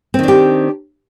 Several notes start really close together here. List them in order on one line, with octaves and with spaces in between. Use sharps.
C4 D#3 D4 G4